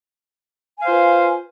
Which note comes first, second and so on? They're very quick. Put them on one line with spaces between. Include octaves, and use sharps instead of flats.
G#5 F5 C5 F4 B4